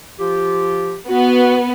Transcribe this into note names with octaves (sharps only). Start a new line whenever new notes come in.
F3 F4 G4
B3 F#4